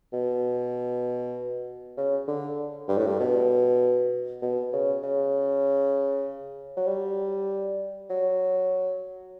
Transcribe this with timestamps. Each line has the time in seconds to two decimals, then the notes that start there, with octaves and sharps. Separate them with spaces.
0.13 B2
1.97 C#3
2.27 D3
2.88 G2
2.98 A2
3.07 G2
3.20 B2
4.42 B2
4.73 C#3
5.03 C#3
6.77 F#3
6.87 G3
8.10 F#3